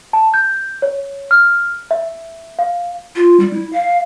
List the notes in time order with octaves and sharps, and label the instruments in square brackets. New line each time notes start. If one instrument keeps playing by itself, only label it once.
[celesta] A5
G6
C#5
F6
E5
F5
[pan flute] F4
G3
E4
F5